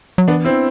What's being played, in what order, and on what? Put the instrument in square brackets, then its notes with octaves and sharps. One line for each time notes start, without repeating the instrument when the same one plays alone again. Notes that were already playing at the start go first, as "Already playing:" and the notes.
[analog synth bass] F#3
[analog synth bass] E3 [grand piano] B3 D4
[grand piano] C4 E4